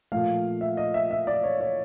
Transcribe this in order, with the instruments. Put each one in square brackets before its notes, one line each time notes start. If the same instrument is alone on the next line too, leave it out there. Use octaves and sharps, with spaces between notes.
[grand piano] A#2 F3 A3 F5
E5
D#5
E5
E5
D5
C#5
C#5